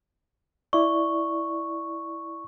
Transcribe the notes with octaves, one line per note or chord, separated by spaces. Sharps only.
E4 D5 C#6